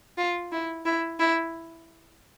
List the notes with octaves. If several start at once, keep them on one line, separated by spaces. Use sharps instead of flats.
F4
E4
E4
E4